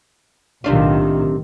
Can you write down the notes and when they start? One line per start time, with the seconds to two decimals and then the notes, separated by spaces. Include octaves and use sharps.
0.64 B1 A2 C3 D#3 D4 F4